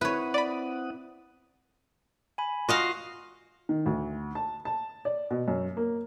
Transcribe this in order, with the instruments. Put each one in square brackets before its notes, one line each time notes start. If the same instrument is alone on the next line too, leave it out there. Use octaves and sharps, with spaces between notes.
[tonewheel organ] C4 F#5 D#6 [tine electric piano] E4 [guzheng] B4 C#5
[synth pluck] D5 B5
[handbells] G#5 B5
[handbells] F4 [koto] F#4 D#5 F5
[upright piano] D#3
D2
A5
A5
D5
B2
F#2
A#3